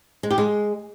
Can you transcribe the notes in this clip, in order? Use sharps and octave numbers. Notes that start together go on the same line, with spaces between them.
G#3
G4
G#3